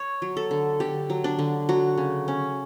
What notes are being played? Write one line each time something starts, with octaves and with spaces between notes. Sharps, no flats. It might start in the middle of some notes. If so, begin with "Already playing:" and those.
Already playing: C#5
F#3
A4
D3
D3 G4
F#3
D4
D3
F#3 F#4
C#3
C#4